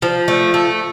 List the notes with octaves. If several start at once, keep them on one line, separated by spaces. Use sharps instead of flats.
F3
A3
A3